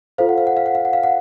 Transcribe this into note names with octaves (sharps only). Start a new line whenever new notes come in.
F4 A4 C5 F5
F#5
F5
F#5
F5
F#5
F5
F#5
F5
F#5